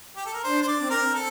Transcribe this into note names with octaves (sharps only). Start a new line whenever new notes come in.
G4
A4
A#4
D4 C5
C5
D5
C4
A#4
A4